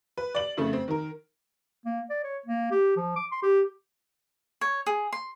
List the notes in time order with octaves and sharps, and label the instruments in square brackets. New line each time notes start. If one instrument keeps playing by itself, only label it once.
[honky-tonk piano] B4
D5 F#7
F2 C#3 A3
C4
D#3 A#4
[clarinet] A#3
D5
C#5
A#3
G4
F3
D6
C6
G4
[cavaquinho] C#5
G#4
C6